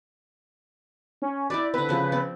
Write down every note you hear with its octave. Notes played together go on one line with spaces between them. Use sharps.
C#4
E4 G4 B4 D5
D3 C4 B4
C#3 F3
C4 D5